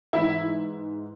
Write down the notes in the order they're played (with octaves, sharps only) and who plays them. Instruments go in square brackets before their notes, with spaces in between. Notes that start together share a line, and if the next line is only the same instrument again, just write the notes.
[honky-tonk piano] G#2 E3 E4 E5